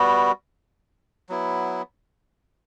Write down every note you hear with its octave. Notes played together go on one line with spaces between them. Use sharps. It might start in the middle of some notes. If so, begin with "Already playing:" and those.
Already playing: G3 B3 F#4
F#3 B3 E4